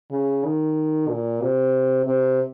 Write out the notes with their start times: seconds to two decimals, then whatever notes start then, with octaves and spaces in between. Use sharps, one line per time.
0.11 C#3
0.44 D#3
1.10 A#2
1.42 C3
2.06 C3